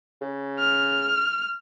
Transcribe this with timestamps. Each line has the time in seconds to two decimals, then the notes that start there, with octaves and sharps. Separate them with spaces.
0.22 C#3
0.59 F6